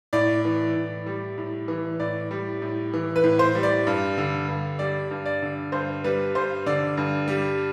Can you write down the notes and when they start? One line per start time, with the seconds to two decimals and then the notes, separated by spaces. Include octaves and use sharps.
0.13 A2 D5
0.45 E3
0.76 A2
1.06 G3
1.38 A2
1.68 E3
2.00 A2 D5
2.31 G3
2.62 A2
2.94 E3
3.16 B4
3.24 A2
3.39 C5
3.55 G3
3.63 D5
3.87 G2
4.18 D3
4.48 G2
4.79 G3 D5
5.11 G2
5.26 D5
5.42 D3
5.72 G2 C5
6.04 G3 B4
6.35 G2 C5
6.66 D3 D5
6.97 G2
7.28 G3